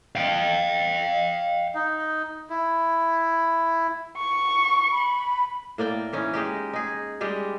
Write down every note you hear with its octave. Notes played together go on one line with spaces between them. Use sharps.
F5 G5
D#4
E4
C#6
B5
A2 A#3 D5 G5
E3 C#4 D#4
G#3 D#4 G4
D#4 G#4
G3 G#3 G4